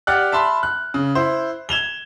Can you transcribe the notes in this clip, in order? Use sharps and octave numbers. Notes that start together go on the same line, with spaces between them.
G4 D5 F#5 F6 F#6
E5 A5 B5 C6
F#6
C#3
E4 C5
G#6 E7 F7 G7